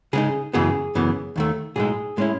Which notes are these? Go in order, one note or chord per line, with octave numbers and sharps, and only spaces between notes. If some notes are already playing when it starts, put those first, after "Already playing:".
C#3 G#3 D#4 G#4
F#2 C#3 E3 B3 G#4
F#2 C#3 E3 B3
D#2 D#3 A3
B1 A2 G#3 D#4 G#4
A2 G#3 C#4 E4